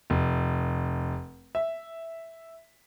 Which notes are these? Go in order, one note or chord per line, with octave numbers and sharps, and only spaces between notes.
F1
E5